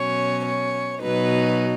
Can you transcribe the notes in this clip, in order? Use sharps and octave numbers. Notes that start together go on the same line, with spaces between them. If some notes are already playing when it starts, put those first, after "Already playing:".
Already playing: B2 F#3 C#4 C#5
C#5
B2 F#3 D#4 B4